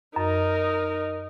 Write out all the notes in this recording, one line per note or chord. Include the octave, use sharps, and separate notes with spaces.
F#2 D#4 A#4